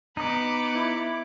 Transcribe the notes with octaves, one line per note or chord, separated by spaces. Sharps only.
B3 D#4 B5 D6 D#6 C#7
E4